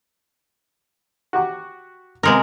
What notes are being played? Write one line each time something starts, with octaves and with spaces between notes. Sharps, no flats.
F#4 G4 C#6
C3 G#3 A#3 B3 A#4